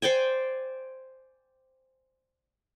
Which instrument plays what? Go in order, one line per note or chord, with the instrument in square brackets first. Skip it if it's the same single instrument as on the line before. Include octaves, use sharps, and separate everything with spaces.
[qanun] C5 D5 G5 G#5